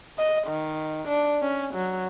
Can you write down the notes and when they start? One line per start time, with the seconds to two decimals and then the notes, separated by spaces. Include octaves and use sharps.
0.18 D#5
0.48 D#3
1.08 D4
1.42 C#4
1.74 F#3